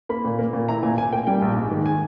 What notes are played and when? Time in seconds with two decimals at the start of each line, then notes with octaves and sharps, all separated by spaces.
0.09 A#3 B5
0.25 A#2
0.39 A#3
0.53 A#2
0.69 E4 A#5
0.83 A#2 G#5
0.98 A#2 G#5
1.12 A#3 G5
1.27 G3 G5
1.42 A#1
1.57 G#2
1.71 D#3
1.86 G#5